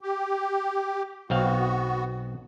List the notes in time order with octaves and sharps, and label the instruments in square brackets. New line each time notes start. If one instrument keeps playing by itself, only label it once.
[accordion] G4
[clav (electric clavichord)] B1 C4 F5 [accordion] B3 F#4